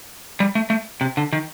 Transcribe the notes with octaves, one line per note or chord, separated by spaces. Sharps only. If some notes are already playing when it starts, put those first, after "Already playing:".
G3
A3
A3
C3
D3
D#3